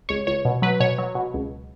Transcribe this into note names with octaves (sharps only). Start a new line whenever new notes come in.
C#2 C#5
C#2 C#5
B2
F#3 B4
B2 C#5
F#3
B2
C#2